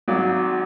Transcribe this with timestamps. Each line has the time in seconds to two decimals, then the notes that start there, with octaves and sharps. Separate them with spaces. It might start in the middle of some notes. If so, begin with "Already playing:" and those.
0.08 G#1 G#2 F#3